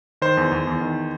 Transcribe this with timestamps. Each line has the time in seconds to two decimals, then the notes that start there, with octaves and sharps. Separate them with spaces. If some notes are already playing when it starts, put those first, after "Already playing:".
0.22 D#3 C5
0.37 E2
0.52 E2
0.67 E2
0.81 D#3